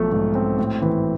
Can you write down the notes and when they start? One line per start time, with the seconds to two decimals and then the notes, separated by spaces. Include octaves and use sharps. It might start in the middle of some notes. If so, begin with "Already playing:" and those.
Already playing: B1 F3 A3
0.12 G#2
0.35 C4
0.58 A2
0.82 E3